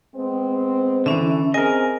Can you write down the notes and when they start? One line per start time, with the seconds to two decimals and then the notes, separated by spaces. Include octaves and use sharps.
0.15 G#3 B3 C4
1.06 D3 E3 C#4 E5
1.54 C4 G#4 A#4 D#5 G#5